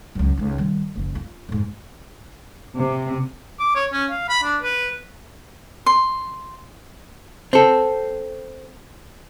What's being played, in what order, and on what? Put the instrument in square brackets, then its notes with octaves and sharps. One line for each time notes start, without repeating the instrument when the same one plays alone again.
[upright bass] C#2 F#2
C#2 D#4
D#3 G3
F#1 F3
F4
F2 G#2
[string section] C3
[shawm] D6
C#5
C#4
F5
B5
D4
B4
[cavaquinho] C6
[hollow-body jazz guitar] C4 A4